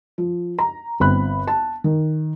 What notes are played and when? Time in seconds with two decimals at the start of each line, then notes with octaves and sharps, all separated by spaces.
0.18 F3
0.59 A#5
1.00 G1 C4 B5 F#6
1.47 A5
1.84 D#3